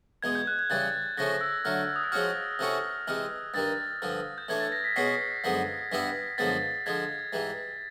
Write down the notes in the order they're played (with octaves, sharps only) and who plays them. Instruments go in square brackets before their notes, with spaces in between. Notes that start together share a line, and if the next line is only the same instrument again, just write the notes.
[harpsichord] E2 B2 G#3 [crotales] G#6
[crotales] G6
F#6
G#6
[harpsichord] C#3 E3 G3 [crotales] A6
[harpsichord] C#3 F3 A3 C#4 [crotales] A#6
[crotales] E6
[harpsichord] D3 F#3 A3 [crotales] F6
[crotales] D#6
E6
[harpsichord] F3 G#3 C#4 F#4 [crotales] F6
[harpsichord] C3 E3 A3 C#4 F#4
[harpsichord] C3 E3 G#3 [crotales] F6
[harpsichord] G2 D#3 G3 [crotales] A6
[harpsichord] G2 D3 F3
[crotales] G6
[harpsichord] A2 E3 A3 D4 [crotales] G#6
[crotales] A6
A#6
B6
[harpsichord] B2 G#3 C#4 F#4 [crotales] C7
[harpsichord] F#2 D3 F3 G#3 B3
G2 E3 G3 B3 E4
[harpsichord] F#2 D3 F3 G#3 B3 [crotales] A6
[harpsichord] D3 F3 G#3 [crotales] G#6
[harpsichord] G#2 E3 G3